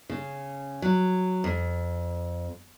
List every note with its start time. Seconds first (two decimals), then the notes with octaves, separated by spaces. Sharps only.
0.09 C#3
0.82 F#3
1.44 F2